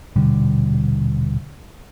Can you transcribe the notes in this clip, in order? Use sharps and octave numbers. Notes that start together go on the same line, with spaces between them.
D#1 B2 D3 G3